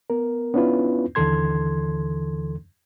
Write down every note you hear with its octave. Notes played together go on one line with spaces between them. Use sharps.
B3 A#4
B3 C#4 D4 E4 F4 B4
D#2 D3 E3 A4 C6 G#6